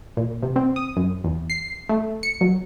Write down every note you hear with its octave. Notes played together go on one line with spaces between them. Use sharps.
A#2
C3
C4
D#6
F#2
E2
C7
A3
C#7
F#3